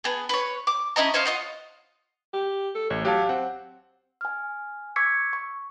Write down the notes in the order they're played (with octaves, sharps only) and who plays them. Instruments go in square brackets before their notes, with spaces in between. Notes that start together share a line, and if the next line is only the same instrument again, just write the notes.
[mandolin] B3 G#4
B4 C#5
D6
C#4 E4 D#5 A#5
C5 C#5 D#5 F5
F4 D#5 F#5
[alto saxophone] G4
A4
[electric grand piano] A1 [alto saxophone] C#5
[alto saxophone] F#3 [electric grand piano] G4 F5 A5
[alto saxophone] C4 [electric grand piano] F#5
[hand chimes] G#5 F6
C#6 D6 E6 G#6 B6 C#7
C#6